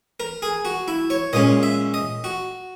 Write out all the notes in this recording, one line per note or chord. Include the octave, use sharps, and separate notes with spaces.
A#4
G#4
F#4
E4
C#5
A#2 G#3 C#4 D#5
E5
D#5
F#4